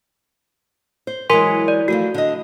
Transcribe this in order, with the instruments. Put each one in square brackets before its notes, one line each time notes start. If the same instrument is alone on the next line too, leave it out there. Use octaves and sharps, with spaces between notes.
[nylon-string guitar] C5
[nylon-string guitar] E3 F#3 G#3 [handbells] A#4 G#5 C6
[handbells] D5
[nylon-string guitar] F3 F#3 A3 [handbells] F#4
[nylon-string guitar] D3 D#5